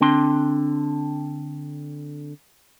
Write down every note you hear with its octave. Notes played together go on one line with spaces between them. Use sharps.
D3 C4 D4 C6